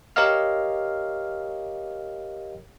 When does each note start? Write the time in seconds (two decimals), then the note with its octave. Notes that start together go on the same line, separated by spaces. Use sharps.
0.16 G4 A#4 C#5 D#5 F5 F6